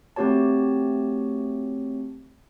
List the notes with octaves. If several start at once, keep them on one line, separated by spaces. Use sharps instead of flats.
A3 C4 F#4 G4 C#5 A5